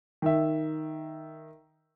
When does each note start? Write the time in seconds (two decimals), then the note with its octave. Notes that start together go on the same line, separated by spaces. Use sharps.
0.22 D#3 E5